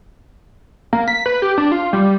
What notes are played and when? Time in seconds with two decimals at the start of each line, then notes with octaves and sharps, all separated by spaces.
0.93 A#3
1.08 B6
1.26 B4
1.42 G4
1.58 D4
1.72 F4
1.93 G3